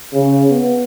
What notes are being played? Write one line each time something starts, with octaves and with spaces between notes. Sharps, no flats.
C#3
B3